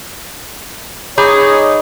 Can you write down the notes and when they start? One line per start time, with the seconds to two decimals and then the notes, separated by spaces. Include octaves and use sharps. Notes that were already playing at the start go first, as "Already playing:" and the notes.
1.18 D#4 G#4 C#5 B5 D6 G6